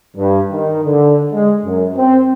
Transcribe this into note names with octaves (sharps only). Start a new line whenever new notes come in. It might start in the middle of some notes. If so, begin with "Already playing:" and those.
G2
D#3
D3
G#3
F#2
C4